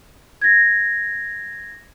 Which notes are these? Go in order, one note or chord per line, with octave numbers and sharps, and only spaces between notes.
G#6 A#6